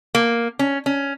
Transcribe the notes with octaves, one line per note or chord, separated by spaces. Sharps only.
A#3
C#4
C#4